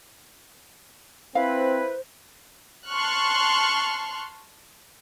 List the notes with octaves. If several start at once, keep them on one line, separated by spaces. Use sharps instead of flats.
C4 E4 B4 C5 F5
A5 C6 C#6 F6 F#6